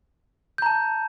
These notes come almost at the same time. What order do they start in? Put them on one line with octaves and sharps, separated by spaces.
G6 A#5 A5